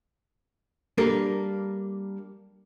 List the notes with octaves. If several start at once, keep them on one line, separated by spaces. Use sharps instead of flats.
G3 A#3 D4 A4 A#4